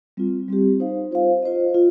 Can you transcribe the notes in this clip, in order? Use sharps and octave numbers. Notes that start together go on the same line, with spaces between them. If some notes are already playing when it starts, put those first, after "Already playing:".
G3 C4 F4
G3 C4 G4
D#4 C5 F5
F4 C5 F5
F4 C5 D#5
F4